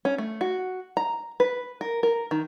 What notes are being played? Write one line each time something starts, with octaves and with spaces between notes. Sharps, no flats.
C#4
A3
F#4
A#5
B4
A#4
A#4
D#3